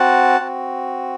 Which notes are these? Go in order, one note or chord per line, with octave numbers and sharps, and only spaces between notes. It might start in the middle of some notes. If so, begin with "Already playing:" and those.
Already playing: C4 F#4 F#5 A5
C4 F#4